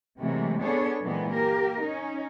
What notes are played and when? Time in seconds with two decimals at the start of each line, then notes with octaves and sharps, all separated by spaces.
0.19 C3 E3 F#3 G#3 A3
0.62 B3 D4 G#4 A4 C#5
1.02 A#2 E3 F#3 G#3 B3 C4
1.31 A#3 G4 A#4
1.81 C#4 D#4